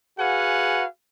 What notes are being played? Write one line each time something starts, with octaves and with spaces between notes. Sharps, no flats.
F#4 G#4 B4 F5 F#5 G#5